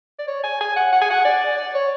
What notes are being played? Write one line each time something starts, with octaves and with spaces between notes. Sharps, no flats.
D5
C#5
G#5
G#5
F#5
F#5
G#5
F#5
D5
D5
C#5